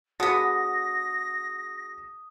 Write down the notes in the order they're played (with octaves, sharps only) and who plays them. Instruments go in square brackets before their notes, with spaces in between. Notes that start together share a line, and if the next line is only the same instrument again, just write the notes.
[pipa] D3 B3 [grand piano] F#4 G#4 [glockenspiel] D#6 [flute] A#6